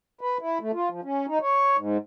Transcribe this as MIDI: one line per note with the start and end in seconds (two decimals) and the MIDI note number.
0.21 0.38 71
0.41 0.58 64
0.61 0.71 57
0.73 0.89 65
0.89 1.01 53
1.03 1.26 61
1.28 1.39 63
1.42 1.77 73
1.77 1.97 44